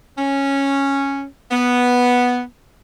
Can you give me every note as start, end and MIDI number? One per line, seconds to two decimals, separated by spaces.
0.17 1.24 61
1.51 2.42 59